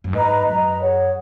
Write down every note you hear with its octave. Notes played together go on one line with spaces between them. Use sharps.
F#2
G#2 B4 D#5 A#5
F#2 B4 D#5 A#5
G#4 C#5 F#5